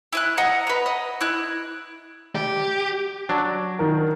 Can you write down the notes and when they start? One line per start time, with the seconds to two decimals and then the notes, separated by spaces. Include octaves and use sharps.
0.13 E4 D#6 F#6
0.37 D#5 F#5 A#5
0.67 B4 A#5
0.86 D#5
1.21 E4 F#6
2.35 G4
3.29 F#3 D4
3.79 D#3 A#4